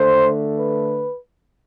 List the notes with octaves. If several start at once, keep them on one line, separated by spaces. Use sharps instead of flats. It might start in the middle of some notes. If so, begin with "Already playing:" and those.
Already playing: D3 A3 C5
B4